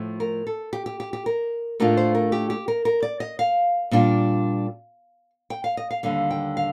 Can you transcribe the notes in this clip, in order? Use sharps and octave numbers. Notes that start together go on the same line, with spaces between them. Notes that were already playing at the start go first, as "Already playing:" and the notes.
Already playing: A2 F3 A3
A#4
A4
G4
G4
G4
G4
A#4
A2 A3 D4 F4 A#4
C5
A#4
G4
G4
A#4
A#4
D5
D#5
F5
A#2 G3 D4 F4
G5
F5
D#5
F5
D#2 D3 G3 F5
G5
F5